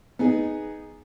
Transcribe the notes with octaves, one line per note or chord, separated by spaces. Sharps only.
B3 D#4 G#4